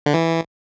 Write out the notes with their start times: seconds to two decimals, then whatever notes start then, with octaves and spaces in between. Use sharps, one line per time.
0.06 D3
0.14 E3